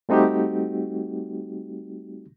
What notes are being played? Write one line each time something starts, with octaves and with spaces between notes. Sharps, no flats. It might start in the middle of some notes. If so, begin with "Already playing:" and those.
G3 A3 C4 D#4 F#4 G4